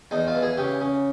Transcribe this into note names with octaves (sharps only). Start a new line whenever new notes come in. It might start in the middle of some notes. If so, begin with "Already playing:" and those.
E2 D#4
F4
E3
G#4
C#3 G4
C#3